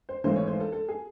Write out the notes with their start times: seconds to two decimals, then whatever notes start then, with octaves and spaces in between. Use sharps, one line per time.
0.09 C5
0.24 G#1 G#2 E3 A3 C5
0.36 C#5
0.48 C5
0.60 A4
0.72 A4
0.88 G#4